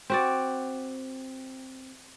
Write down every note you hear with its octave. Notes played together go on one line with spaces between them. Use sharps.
C4 F#4 D5